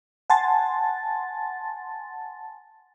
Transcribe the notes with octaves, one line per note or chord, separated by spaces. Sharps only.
F#5 G#5 A5 C6 A6